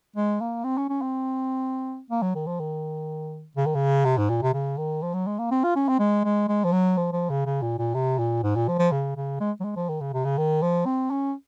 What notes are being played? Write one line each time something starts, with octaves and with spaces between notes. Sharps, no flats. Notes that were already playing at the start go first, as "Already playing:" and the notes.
G#3
A#3
C4
C#4
C#4
C4
A#3
F#3
D#3
F3
D#3
C#3
D#3
C#3
C3
G#2
A#2
C3
C#3
D#3
F3
F#3
G#3
A#3
C4
F4
C#4
C4
G#3
G#3
G#3
F3
F#3
F3
F3
C#3
C#3
A#2
A#2
C3
A#2
G#2
A#2
F3
F3
C#3
C#3
G#3
F#3
G#3
F3
D#3
C#3
C3
C#3
D#3
F3
C4
C#4